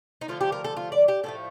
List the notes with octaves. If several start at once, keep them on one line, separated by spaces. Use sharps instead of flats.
D#4
D3 F3 A3 F4
G4
A#4
A4
F4
D5
G4
A2 F3 A3 A4